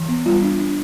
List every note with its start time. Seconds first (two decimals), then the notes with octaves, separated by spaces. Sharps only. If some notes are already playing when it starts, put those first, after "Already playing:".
Already playing: E3
0.08 B3
0.26 G3 F4
0.43 D4
0.59 D4